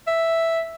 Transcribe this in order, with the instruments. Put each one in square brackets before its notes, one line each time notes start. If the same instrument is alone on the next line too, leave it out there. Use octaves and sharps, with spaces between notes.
[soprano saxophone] E5